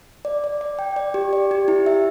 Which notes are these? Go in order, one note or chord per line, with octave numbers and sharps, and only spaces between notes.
D5
D5
D5
G5
D5
G4
D5
G4
E4
E5